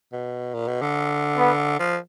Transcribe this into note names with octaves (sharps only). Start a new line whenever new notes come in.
B2
A#2
B2
D3
B3
F3